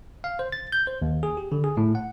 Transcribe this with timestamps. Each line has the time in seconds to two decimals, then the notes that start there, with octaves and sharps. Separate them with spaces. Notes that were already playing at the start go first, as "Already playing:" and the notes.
0.24 F5
0.39 C5
0.52 A6
0.72 G6
0.87 C5
1.02 D#2
1.23 G#4
1.37 G4
1.52 D3
1.64 G#4
1.77 A2
1.95 F#5